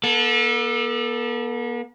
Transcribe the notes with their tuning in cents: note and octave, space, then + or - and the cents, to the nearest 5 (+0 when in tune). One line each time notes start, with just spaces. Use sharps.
B3 -45 A4 +0